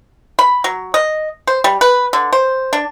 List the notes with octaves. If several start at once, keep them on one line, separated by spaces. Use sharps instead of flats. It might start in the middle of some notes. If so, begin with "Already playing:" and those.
B5
F#3
D#5
C5
G3
B4
D3
C5
D4